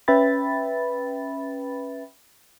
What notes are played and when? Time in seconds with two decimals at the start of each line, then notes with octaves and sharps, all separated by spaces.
0.08 C#4 B4 E5 G5 B5 A6